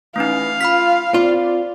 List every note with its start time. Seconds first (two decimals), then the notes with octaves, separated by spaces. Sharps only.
0.16 E3 A3 C#4 D#4 F5
0.61 F4 B5 F6 B6
1.14 C4 F4 D5